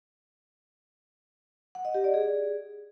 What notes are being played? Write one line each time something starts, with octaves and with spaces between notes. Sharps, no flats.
F#5
D#5
G4
D5
G#4